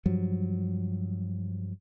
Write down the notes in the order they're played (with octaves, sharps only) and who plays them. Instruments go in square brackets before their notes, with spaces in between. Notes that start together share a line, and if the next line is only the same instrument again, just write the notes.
[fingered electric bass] G2 F3 F#3